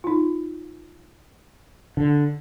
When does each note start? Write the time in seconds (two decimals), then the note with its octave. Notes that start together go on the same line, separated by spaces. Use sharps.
0.04 D#4 F4
1.97 D3